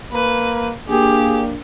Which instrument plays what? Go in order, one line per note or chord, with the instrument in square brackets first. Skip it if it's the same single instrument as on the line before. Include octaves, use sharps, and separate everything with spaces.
[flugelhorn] A#3 [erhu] B4
[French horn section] A#3 D4 [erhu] G4 [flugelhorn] G#4